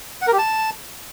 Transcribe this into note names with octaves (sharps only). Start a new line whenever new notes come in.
F#5
A#4
G4
A5